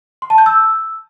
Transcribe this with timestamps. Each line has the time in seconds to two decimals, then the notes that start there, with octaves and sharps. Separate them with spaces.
0.22 C6
0.30 A5
0.38 G6
0.46 E6